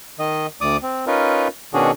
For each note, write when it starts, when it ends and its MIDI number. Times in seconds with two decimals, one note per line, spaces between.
0.19 0.46 51
0.19 0.46 75
0.61 0.77 38
0.61 0.77 74
0.61 0.77 86
0.61 0.77 87
0.83 1.05 60
1.07 1.48 61
1.07 1.48 63
1.07 1.48 65
1.07 1.48 70
1.07 1.48 71
1.74 1.91 47
1.74 1.91 51
1.74 1.91 61
1.74 1.91 62
1.74 1.91 66
1.74 1.91 68